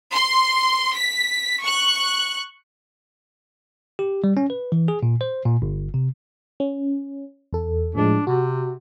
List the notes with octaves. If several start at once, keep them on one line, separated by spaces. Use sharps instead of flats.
C6
B6
C#6 F#6
G4
G3
C#4
B4
E3
G#4
A#2
C5
A#2
G1
C3
C#4
E2 A4
A2 F3 G#3 D4
C3 F#4